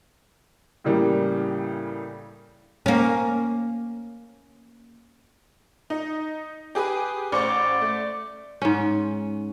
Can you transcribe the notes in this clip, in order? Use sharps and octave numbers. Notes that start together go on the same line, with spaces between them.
A2 C#3 E3 G3 A#3
A#3 C#4
D#4
G4 G#4 B4
A1 C5 D5 C#6
A3
G#2 C#4